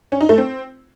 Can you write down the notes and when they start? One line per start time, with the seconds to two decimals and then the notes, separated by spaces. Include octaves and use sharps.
0.12 C#4
0.21 D#4
0.29 A3
0.38 C4